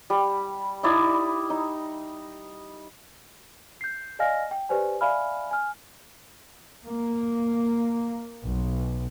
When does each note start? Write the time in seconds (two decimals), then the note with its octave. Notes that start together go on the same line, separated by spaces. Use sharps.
0.10 G3
0.83 D#4 E4 D5 D#6
1.50 D#4
3.81 G6 C7
4.19 D5 D#5 F5 G#5 F6 A#6
4.51 G5
4.69 G4 B4 C5 D5 G#5
5.01 D5 E5 F5 G#5 B5 F6
5.51 G#5 F6
6.85 A#3
8.45 B1